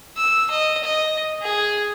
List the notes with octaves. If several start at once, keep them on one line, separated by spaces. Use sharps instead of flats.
E6
D#5
D#5
G#4